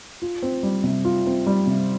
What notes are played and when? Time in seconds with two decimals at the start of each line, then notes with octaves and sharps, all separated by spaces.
0.22 F4
0.42 C4
0.63 G3
0.84 C3
1.05 F4
1.26 C4
1.47 G3
1.67 C3